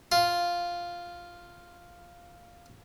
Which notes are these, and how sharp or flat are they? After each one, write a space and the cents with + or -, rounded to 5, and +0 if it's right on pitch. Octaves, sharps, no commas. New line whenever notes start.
F4 +0